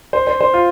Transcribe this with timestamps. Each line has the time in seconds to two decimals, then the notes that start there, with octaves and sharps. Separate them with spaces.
0.13 C5
0.27 C5
0.41 C5
0.54 F4